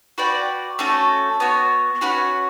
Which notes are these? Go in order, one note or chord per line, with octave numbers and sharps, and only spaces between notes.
F#4 B4 D5 G5
A3 C#4 F#4 A4
B3 F#4 C#5
C#4 F#4 B4 F#5